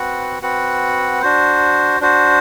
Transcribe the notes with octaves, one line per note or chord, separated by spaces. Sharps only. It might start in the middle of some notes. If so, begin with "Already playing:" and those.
Already playing: C4 F#4 B4 F#5
C4 F#4 B4 F#5
D4 F#4 C5
D4 F#4 C5